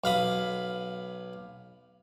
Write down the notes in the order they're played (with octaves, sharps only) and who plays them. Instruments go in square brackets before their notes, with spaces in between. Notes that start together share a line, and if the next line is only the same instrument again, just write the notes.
[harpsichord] B1 F5 B5 D#6